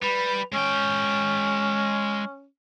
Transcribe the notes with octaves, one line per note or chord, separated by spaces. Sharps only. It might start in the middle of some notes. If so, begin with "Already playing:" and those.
G3 B4
G#3 C#4 G5